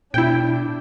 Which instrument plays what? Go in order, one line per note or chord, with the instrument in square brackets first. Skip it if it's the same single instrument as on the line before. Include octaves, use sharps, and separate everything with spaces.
[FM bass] B2 [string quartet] D4 [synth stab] E4 G5